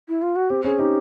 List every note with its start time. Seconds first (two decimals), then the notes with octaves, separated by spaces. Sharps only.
0.09 E4
0.22 F4
0.36 F#4
0.50 C4 G4
0.64 C#4 G#4
0.79 D#4 G4